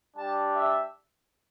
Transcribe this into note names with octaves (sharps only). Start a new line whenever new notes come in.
G3 D4 G4 A5
E5